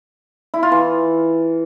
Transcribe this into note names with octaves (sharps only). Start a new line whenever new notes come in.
E4
F4
E3